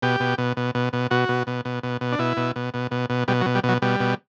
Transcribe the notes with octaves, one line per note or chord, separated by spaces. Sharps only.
B2 G4
B2
B2
B2
B2
B2
B2 F#4
B2
B2
B2
B2
B2
D4
B2 E4
B2
B2
B2
B2
B2
B2 G3
F#3
B2
G3
B2
F#3
B2 G3
B2